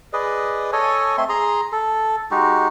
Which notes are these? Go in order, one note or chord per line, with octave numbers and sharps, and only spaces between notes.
G#4 B4 D5 D#5
A4 C#5 D#5 G#5
A3 C4 E5 C6
G#4 A#5 C6
A4
G#3 D#4 F#4 G4